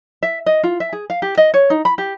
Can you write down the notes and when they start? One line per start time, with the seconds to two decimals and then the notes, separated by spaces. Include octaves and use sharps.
0.23 E5
0.46 D#5
0.64 F4
0.80 E5
0.93 G#4
1.10 F5
1.22 G4
1.37 D#5
1.54 C#5
1.70 D#4
1.85 B5
1.98 G4